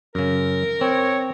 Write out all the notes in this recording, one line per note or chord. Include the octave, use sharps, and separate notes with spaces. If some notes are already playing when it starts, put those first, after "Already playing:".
F#2 C#3 A#4
C4 C#5